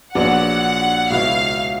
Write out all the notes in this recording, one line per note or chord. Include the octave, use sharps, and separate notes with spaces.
A#1 A#2 F#3 B3 D4 F#5
C#2 B2 F#3 B3 E4 F5